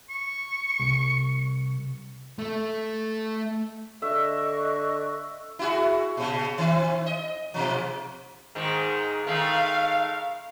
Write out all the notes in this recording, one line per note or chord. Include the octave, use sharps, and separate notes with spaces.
C#6
C2
A3 A4
D3 D#5 E5 C#6 F#6
E4 F#4 G#4
A#2 C#3
D#3 C4
D#5
G#2 B2 F3
G#2 D#3 G#3
D#3 G#3 A3 F5